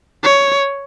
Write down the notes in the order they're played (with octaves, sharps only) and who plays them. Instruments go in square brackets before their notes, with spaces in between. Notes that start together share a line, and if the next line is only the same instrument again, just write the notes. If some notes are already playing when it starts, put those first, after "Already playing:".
[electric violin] C#5